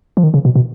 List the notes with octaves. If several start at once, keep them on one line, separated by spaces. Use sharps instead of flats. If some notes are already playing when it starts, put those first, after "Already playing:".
F3
D#3
C#3
B2
B2